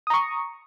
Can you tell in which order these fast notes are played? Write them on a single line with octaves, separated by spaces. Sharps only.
D#6 A#5 C#6